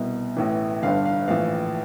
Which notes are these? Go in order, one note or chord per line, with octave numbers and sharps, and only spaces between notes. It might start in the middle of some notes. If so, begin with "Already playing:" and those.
Already playing: C2 B2
A1 A2 E3
G1 G2 D3 F5
F5
A#1 A2 E3 F5